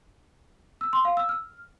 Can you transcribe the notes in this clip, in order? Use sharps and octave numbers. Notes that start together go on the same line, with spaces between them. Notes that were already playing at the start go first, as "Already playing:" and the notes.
E6
C6
F5
E6
F6